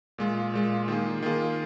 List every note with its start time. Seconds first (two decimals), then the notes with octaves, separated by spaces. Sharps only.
0.18 A#2 G#3 F4
0.54 A#2 G#3 F4
0.88 D#3 A#3 F4 G#4
1.22 D#3 A#3 F4 G#4